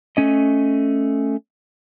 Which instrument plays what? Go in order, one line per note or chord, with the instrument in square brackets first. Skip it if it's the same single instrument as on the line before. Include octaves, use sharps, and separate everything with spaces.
[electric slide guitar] A3 C#4 D#5